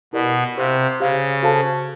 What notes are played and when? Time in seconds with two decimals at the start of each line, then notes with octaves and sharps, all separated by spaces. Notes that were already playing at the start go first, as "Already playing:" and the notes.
0.13 B2 E4 G4 A#4 D5
0.57 C3 G4 C5 F5
1.00 C#3 G4 C5 F5
1.43 F#4 A4 C5 F5 A5